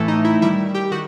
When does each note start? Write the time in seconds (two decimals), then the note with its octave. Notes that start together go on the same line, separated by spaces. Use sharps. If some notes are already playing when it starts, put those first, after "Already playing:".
Already playing: A2 E3 A3
0.08 D#4
0.25 E4
0.41 D#3 G3 E4
0.74 G4
0.91 D#3 F#4